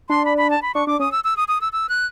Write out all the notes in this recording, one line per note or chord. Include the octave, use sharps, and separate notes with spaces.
D4 C6
B5
B5
A5
B5
D4 C#6
D4 D6
C#4 D#6
E6
E6
D#6
D#6
E6
E6
F#6